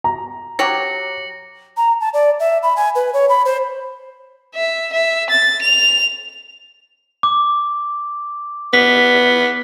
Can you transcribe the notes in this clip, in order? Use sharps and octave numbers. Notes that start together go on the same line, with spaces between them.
A#5
F#3 G4 C#5 A#6 C#7 F#7
A#5
A5
D5
E5
B5
G#5
B4
C#5
B5
C5
E5
E5
A6
F7
D6
B3 B6